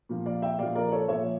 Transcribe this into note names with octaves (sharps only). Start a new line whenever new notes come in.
A#2 F3
D5 F5
E5 G5
A#2 F3 D5 F5
A#4 D5
A4 C#5
A#2 F3 C#5 E5